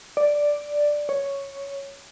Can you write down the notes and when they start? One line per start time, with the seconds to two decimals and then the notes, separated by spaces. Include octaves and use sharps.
0.17 D5
1.09 C#5